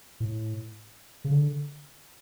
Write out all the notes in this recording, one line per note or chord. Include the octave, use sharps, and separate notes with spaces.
A2
C#3
D3